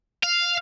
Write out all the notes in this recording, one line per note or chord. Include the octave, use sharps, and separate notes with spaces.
F5